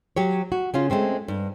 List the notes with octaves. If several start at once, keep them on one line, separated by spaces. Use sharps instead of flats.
F#3 G4 C#5
F#4
C#3 C#4 F4
G#3 A3 C4 C#4
G2